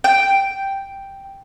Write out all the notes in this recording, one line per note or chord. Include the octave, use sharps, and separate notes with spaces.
G5